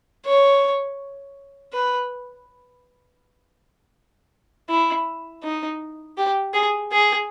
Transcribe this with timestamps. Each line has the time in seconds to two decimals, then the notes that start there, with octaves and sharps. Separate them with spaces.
0.26 C#5
1.73 B4
4.69 E4
5.43 D#4
6.18 G4
6.54 G#4
6.91 G#4